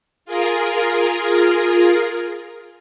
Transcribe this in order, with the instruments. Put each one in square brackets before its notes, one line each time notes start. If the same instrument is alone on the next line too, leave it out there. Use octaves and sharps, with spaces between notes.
[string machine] F4 G#4 A#4